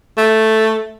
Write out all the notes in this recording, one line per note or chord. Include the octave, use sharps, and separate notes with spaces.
A3